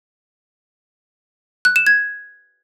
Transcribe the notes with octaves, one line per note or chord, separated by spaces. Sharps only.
F#6
E7
G#6